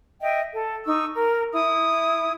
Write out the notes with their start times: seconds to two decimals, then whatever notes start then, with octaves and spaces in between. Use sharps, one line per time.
0.21 D#5 E5 G5
0.52 A4
0.85 D#4 C#6 E6
1.14 A#4
1.52 E4 D#6